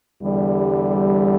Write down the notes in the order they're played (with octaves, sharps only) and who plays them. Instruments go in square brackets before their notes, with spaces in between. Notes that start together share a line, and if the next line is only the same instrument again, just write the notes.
[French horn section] E2 D3 G3